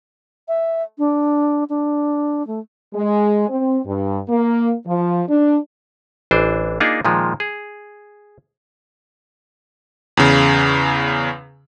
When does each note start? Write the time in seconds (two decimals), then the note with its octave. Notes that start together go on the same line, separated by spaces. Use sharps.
0.48 E5
0.98 D4
1.69 D4
2.47 A3
2.94 G#3
3.49 C4
3.86 G2
4.29 A#3
4.86 F3
5.28 D4
6.31 A1 E3 D4 C5
6.80 A#3 D4 D#4 F4 G#4
7.05 A#2 D#3 F3 G#3
7.40 G#4
10.17 E2 C#3